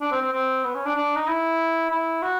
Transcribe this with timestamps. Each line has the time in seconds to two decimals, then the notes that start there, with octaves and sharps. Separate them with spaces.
0.01 D4
0.12 C4
0.22 C4
0.33 C4
0.64 B3
0.75 C#4
0.85 D4
0.96 D4
1.16 D#4
1.27 E4
1.90 E4
2.22 F#4